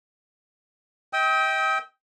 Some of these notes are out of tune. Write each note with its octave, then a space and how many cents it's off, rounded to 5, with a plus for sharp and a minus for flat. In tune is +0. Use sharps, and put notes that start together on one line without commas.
D#5 +40 G5 +0 D#6 +45